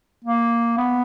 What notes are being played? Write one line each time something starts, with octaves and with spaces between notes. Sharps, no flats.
A#3
B3